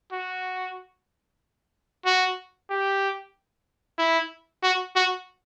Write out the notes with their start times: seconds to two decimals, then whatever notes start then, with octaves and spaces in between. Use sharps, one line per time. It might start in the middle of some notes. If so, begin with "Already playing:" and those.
0.12 F#4
2.06 F#4
2.70 G4
3.99 E4
4.63 F#4
4.96 F#4